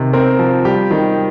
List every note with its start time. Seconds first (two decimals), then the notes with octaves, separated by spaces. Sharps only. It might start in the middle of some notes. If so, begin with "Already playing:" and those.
Already playing: C3 D#3
0.13 C4 A#4
0.39 F3
0.65 G3 G4
0.91 D#3